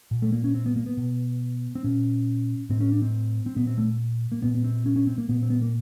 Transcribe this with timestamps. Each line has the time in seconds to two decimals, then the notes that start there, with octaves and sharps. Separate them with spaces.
0.11 A#2
0.22 A3
0.32 A#3
0.44 C#4
0.55 C4
0.66 B3
0.76 A#3
0.86 B3
0.97 B2
1.75 C4
1.84 A#2 C#4
2.69 A2 C4
2.80 C#4
2.92 D4
3.02 C4
3.46 C4
3.56 A#2 B3
3.67 C4
3.78 A3
4.32 A#3
4.42 A#2 B3
4.55 B3
4.64 C4
4.86 C#4
4.96 C#4
5.07 C4
5.18 A#3
5.29 A#2 B3
5.43 C4
5.50 B3
5.62 A#3